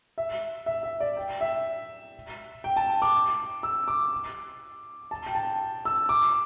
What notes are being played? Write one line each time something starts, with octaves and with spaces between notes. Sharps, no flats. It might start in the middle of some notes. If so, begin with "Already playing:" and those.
E5
E5
E5
D5
G5
E5
G5
A5
D6
E6
D6
A5
G5
A5
E6
D6